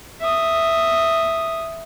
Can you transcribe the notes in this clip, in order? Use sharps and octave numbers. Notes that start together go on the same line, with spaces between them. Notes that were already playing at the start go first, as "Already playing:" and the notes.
E5 D#6